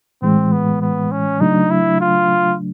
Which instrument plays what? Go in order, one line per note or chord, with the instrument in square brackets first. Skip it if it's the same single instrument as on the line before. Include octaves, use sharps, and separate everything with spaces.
[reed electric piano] A2 E3 G#3 [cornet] C4
[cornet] B3
B3
C#4
[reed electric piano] C#3 F#3 A3 D4 [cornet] D#4
[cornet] E4
F4